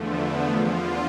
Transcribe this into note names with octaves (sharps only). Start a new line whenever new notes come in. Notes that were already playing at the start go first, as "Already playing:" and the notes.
Already playing: E2 D3 F3 A3
B3
E2 D3 F3 F4